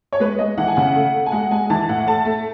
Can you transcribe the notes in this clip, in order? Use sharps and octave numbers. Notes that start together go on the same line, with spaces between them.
C#5
G#3 B4
G#3 D#5
E3 F#5
G#5
C#3 F#5
A3
A3
G#5
G#3 F#5
G#3 G#5
E3 A5
A2 F#5
A3 A5
A3